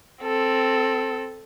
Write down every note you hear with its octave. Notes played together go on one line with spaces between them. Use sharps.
C4 A4